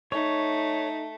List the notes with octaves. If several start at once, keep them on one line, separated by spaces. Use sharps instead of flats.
A3 D#4 C#5